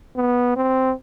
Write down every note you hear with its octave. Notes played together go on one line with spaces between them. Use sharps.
B3
C4